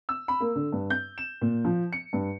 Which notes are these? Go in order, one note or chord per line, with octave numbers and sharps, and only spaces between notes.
E6
B5
A#3
D3
G2
G6
E7
A#2
F3
C#7
G2